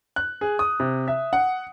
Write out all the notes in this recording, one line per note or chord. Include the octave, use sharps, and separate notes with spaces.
F#6
G#4
D#6
C3
E5
F#5